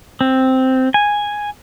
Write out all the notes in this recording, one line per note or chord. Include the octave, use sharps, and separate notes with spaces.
C4
G#5